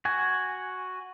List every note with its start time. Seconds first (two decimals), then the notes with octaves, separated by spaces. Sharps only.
0.05 F#4 G#5